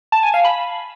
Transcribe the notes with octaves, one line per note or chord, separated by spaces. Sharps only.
A5
G#5
F5
B5